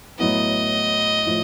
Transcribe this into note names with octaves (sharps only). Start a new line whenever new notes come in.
A2 F#3 B3 E4 D#5
A2 F3